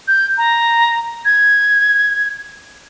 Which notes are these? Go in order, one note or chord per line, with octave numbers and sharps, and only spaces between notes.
G6
A#5
G#6